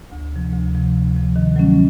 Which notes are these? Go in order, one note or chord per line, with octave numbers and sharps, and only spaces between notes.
D2
C3 F3
D2
C3 F3
D2
C3 F3
D#3
F#3 A3 C#4